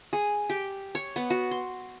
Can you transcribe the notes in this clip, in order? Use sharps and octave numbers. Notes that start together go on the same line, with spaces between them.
G#4
G4
C#5
B3
F#4
C6